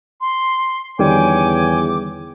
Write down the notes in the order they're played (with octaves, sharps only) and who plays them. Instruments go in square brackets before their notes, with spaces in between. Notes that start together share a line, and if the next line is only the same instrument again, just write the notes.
[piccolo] C6
[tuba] E2 [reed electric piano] D3 D#3 G3 [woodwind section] C#5 G5 G#5 [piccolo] D6